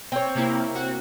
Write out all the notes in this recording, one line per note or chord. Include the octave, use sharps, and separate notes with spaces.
C4 C#5
C3 A#3 E4
F#4